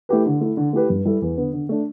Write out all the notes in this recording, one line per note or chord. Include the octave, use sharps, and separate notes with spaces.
A3 E4 G4 B4
D3
A3 E4
D3
A3 E4 G4 B4
G2
G3 E4 A4
E2
D3 B3
D3
A3 D4